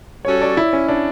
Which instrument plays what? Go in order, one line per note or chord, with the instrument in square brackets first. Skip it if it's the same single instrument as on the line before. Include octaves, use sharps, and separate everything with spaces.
[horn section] G3 C#4 F#4 A4 [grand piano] C#5
[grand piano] D5
E4
C#4
D4